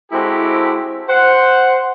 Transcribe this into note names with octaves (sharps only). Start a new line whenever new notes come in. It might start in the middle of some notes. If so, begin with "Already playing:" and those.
G#3 C4 E4 F#4 G4 A4
C5 F#5